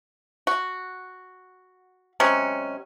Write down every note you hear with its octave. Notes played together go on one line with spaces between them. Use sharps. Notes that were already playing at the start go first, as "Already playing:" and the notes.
F#4
C3 F#3 G#3 C#4